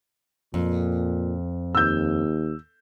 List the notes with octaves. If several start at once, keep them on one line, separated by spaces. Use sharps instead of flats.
F2 A#2
D#2 E6 G6